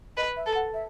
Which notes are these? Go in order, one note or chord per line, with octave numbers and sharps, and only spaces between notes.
B4 D#5
E5
A4
F#5
E5